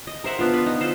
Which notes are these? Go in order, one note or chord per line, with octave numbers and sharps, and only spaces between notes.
D#5
A#4 C5 E5 F#5
B3 D4 F4
B4
D#4
F4 A4 C5